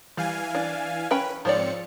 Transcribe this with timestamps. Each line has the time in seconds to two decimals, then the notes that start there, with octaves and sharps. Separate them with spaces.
0.17 E3 G3 F5 G#5
0.55 D4
1.11 C#4 B4 G5 B5
1.45 G#2 F3 C4 C#5 D5 C#7